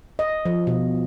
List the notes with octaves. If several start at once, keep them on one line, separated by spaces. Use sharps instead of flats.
D#5
F3
B2